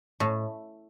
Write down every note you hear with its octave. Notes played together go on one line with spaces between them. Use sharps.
A2